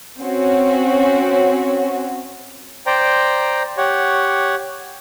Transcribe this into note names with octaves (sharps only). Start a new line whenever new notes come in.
C4 C#4 F#4
C5 D5 G5 A#5
G4 C#5 F#5